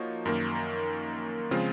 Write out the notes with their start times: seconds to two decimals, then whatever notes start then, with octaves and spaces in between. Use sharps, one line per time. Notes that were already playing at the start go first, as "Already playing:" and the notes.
Already playing: F3 A#3 D#4 F#4 C#5
0.25 F#2 D#3 A#3
1.51 C#3 F3 G#3 C4 F4